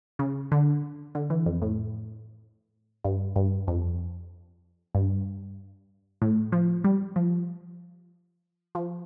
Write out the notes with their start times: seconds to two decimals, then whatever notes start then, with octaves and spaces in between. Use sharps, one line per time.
0.19 C#3
0.52 D3
1.15 D3
1.30 E3
1.46 F2
1.62 A2
3.05 G2
3.36 G2
3.68 F2
4.95 G2
6.22 A2
6.52 F3
6.84 G3
7.16 F3
8.75 F3